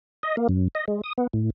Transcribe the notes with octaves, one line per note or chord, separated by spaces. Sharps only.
D#5
A#3
F#2
D#5
G#3
D#6
B3
A2